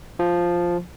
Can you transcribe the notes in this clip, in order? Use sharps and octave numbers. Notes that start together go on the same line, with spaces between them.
F3